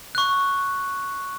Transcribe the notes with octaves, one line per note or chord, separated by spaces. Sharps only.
C#6 F#6